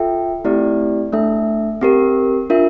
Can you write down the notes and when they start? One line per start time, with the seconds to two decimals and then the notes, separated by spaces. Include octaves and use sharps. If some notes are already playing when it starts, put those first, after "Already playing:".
Already playing: F4 A4 E5 G5
0.45 A3 C4 E4 G4 D5
1.12 A3 D4 A4 E5
1.81 C4 G4 A#4
2.50 D4 F4 A#4 E5